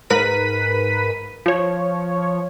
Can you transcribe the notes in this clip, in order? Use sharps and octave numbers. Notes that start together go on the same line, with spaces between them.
G#2 A#4 B4 B6 D#7
F3 C#5